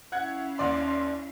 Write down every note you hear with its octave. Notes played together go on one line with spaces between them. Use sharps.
C#4 E4 F5 F#5 F#6 G#6
D#2 D5 C6